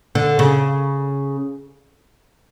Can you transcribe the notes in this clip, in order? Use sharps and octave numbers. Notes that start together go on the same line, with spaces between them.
D3
C#3